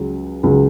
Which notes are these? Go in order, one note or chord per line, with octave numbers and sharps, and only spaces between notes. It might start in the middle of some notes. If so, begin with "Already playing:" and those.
Already playing: C#2 C#3 F#3
C#2 C#3 F#3